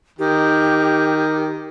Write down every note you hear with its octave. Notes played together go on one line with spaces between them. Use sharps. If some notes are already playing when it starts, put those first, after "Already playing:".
D#3 G4